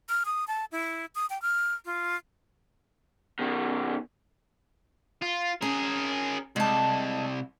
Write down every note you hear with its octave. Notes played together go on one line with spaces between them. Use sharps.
F6
D#6
A5
E4
D#6
G5
F6
F4
B2 D#3
F4
C#4 G#4 A#4
C2 G#3 A5